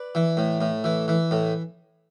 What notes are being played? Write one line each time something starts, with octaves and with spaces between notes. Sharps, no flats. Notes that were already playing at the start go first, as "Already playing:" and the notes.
Already playing: B4 D5
E3
A2
A2
E3
E3
A2